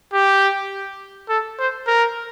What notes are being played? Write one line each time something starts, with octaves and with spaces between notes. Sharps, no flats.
G4
A4
C5
A#4